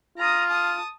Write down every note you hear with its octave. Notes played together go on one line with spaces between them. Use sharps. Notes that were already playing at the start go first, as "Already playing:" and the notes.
F4 A#5 D#6
A5 D#6